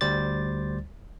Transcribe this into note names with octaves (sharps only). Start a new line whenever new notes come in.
D2 G3 C5 D5 A6